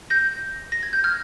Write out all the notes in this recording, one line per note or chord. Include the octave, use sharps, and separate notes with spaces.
G6 A#6
A#6
G#6
G6
F6 G#6